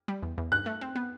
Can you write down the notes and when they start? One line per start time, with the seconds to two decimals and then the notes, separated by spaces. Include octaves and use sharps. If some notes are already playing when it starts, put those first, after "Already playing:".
0.08 G3
0.23 E2
0.38 E2
0.52 G2 F#6
0.66 A3
0.81 C4
0.96 B3